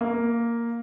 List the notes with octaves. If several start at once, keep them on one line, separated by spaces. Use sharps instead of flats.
A#3